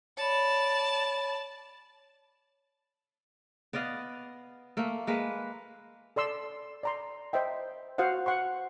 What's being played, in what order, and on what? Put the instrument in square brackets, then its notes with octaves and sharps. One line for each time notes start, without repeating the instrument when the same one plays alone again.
[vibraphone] C#5 B5 [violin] D5 A5
[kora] B3 D5 D#5 F5
A3 A#3
G#3 A#3 B4
[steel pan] A4 D5 C6 E6
D5 A#5 C6
C5 D#5 E5 G5
F#4 C5 F5 F#5
F#5 C6 C#6